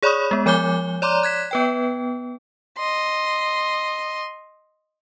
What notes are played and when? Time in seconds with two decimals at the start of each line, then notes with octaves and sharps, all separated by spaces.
0.02 G#4 C#5 D5 B5 C#6 D#6
0.31 G#3 B3
0.46 F3 C#5 G#5 D6 G6 G7
1.02 C#5 D5 A#5 C6 D6
1.23 F#6 G#6 B6 E7
1.51 B3 B4 G5
2.78 D#5 C6